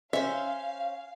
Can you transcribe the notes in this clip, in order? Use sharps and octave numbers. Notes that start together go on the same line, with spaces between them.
C#4 C5 E5 F5